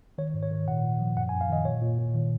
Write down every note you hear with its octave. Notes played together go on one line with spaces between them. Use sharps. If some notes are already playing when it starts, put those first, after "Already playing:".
D#3 C#5
G#2
C#5
D#3
A#2 F#5
A#2
F3
F#2 F#5
G#5
F#2
F5
D#3 D#5
A#2 C#5
A#2
A#2
D#3